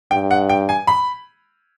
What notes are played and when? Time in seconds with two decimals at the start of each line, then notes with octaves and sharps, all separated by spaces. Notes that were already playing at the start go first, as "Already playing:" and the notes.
0.11 G2 G5
0.31 F#5
0.50 G5
0.69 G#5
0.87 B5